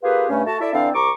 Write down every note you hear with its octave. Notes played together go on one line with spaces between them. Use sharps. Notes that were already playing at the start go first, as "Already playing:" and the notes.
A#3 F4 G4 G#4 B4
G2 A3 C#4
A3 F#4 A5
E4 A4 D5 E5
D3 E3 C4 D4 D5 F5
C2 A#5 C#6 D6